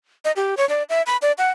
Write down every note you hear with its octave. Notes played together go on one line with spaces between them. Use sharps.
D#5
G4
C#5
D5
E5
B5
D5
F#5